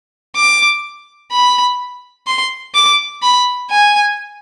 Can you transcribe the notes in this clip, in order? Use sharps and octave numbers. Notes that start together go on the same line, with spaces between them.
D6
B5
C6
D6
B5
G#5